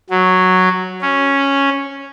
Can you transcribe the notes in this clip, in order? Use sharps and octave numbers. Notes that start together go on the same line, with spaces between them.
F#3
C#4